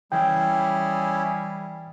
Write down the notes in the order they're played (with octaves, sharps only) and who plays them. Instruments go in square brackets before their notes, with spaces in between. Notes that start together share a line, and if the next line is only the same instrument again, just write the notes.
[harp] E3 [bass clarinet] G3 [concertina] C#4 E4 G#4 [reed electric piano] G5